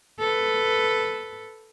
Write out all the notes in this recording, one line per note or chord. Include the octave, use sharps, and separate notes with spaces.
A4 B4